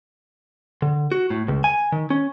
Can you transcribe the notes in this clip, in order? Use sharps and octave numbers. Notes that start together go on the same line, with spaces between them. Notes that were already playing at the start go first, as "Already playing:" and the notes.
D3
F#4
A2
C#2
G#5
D#3
C#4